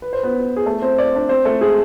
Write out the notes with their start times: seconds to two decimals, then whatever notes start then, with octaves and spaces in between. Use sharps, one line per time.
0.02 B4
0.13 C5
0.23 B3 B4
0.57 G#4
0.66 A3 A4
0.82 C4 C5
0.98 D5
1.16 D4 D5
1.29 C4 C5
1.45 A3 A4
1.61 G#3 G#4